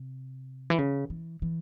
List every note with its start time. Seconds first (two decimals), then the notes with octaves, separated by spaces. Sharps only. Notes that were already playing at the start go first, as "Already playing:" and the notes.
Already playing: C3
0.70 E3
0.78 C#3
1.10 E3
1.42 E3